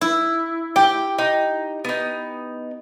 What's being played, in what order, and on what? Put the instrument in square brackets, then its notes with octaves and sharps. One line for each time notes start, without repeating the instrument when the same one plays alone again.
[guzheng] E4
[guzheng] G4 [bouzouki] G5
[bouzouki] D#4
B3 D#4